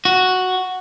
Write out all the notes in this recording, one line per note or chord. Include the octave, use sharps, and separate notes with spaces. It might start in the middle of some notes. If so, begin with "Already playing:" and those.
F#4